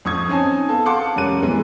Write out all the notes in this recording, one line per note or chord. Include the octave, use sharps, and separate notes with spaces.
F2 C#6 D#6 G#6
C4 C#4 D#4 G#5 A5
B3 A4 F5 A5
F5 F#5 A5 C6 D6
F1 G3 C#4 A#4 F#6 D#7
E3 G#3 B3